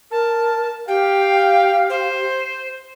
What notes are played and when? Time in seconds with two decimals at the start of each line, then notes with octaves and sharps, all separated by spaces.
0.11 A#4 A5
0.88 G4 F5 G5
1.90 C5